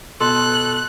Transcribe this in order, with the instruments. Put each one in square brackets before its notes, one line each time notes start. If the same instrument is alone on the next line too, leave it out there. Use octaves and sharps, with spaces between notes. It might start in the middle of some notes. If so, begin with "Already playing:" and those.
[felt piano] B2 [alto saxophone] A4 [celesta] C6 [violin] F#6